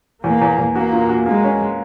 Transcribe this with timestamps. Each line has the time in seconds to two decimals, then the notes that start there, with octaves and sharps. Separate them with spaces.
0.24 E2 A#3
0.42 E2
0.58 E2
0.75 A#3 F#4
0.93 A#2
1.09 F#4
1.26 G#3 A#3
1.44 C#4